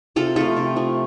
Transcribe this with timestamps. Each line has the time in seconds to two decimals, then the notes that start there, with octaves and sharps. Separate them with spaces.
0.16 C3 F4 A4
0.36 F3 A3 F4 A4
0.57 C3
0.76 F3 A3